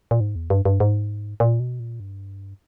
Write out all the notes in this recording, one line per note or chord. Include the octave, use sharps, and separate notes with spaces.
A#2
G#2
E2
G2
G2
G#2
A#2
B2
A#2
G2